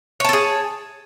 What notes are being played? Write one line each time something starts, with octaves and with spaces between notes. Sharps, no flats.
G#4 A4 C#5 A5